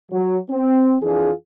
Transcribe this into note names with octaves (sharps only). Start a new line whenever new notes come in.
F#3
C4
F2 E3 D4 F4 G#4